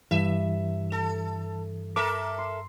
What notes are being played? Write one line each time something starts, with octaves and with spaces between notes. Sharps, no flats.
G2 E3 E5 D#7
A4
A4 A#4 E5 D6
C6